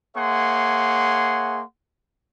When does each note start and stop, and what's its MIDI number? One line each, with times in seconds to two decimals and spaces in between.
0.16 1.62 58
0.16 1.62 68
0.16 1.62 73
0.16 1.62 76
0.16 1.62 78
0.16 1.62 84